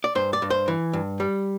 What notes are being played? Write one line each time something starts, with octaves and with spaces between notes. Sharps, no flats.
D5
G2 C5
D5
G2
C5
E3
G2
G3